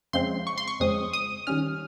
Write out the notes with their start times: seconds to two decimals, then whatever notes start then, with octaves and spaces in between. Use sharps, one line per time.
0.13 F2 C#3 F3 G#3 C4 C6
0.47 C#6
0.58 C6
0.68 C#6
0.80 F2 C#3 F3 G#3 C4 D#6
1.13 D#6
1.47 D#3 G3 C#4 F6